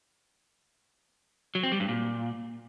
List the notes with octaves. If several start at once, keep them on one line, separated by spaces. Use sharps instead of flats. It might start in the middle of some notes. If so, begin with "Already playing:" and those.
F#3
C4
G3
G2
A#2